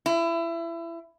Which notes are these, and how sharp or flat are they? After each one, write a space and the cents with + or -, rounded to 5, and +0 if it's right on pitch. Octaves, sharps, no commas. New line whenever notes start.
E4 +25